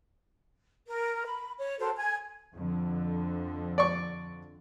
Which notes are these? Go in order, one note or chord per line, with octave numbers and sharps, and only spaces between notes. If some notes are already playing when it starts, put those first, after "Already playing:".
A#4
B5
C#5
F#4 A4 A#4 C5
G#5 G#6
F2 D3
D5 C#6